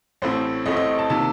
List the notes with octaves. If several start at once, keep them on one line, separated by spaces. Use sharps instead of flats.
A1 A2 A3 C4 C5
A1 A2 A3 C4 D#5
D#5
A5
C3 D#3 A#3 A5